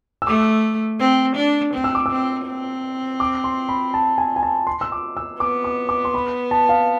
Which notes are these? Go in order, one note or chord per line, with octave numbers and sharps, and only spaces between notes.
E6
A3 D6
C4
D4
C4
E6
D6
C4 E6
C4
D6
C6
B5
A5
G#5
G#5
A5
C6
E6
D6
E6
B3 D6
D6
D6
C6
B5
A5
F5